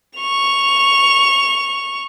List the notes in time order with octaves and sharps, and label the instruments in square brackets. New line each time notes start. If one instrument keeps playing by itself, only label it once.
[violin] C#6 F7